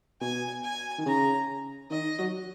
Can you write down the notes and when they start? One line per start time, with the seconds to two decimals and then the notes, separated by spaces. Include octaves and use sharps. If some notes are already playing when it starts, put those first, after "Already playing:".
0.21 B2 G#5
0.64 G#5
0.98 D#3
1.06 C#3 A#5
1.90 D#3 D#5
2.18 F#3